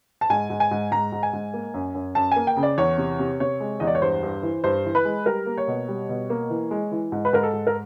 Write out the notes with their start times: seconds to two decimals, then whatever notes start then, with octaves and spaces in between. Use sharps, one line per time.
0.21 A5
0.30 G#2 G#5
0.50 G#2
0.60 G#5
0.71 G#2
0.91 G#2 A#5
1.12 G#2
1.23 G#5
1.33 G#2
1.54 A#3
1.74 F#2
1.95 F#2
2.15 F#2 A5
2.32 A#3 G#5
2.47 G5
2.57 C#3
2.63 D5
2.78 E2 C#5
2.98 C3
3.19 C3
3.40 C3 C#5
3.60 G#3
3.80 E2 D#5
3.87 D5
3.95 C#5
4.02 G2 C5
4.23 G2
4.43 E3
4.64 G2 C5
4.85 E3
4.95 B4
5.05 G#3
5.26 G3 A#4
5.46 A#3
5.58 C#5
5.68 B2
5.88 G3
6.09 B2
6.30 A#3
6.50 E3
6.71 G#3
6.92 E3
7.12 G#2
7.25 B4
7.33 G#2 A#4
7.43 A4
7.53 G#2
7.67 A#4